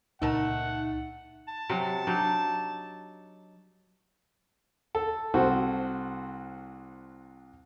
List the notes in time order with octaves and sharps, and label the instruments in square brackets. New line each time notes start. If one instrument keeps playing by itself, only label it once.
[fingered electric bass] C#2 A#2 [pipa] A3 A#4 A5 [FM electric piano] D#4 [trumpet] F#5
[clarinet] A5
[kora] C3 F#3
F#3 D4 D#4
[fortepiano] A4
C2 F#4 A4 C5